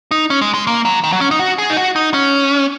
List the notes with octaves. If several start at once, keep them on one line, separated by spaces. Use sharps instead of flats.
D#4
C#4
G#3
G#3
A#3
F#3
D#3
F#3
C#4
D#4
F#4
G#4
D#4
F#4
D#4
C#4